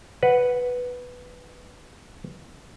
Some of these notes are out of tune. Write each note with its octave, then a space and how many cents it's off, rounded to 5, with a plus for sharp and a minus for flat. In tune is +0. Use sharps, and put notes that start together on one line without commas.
B4 +0 F#5 +0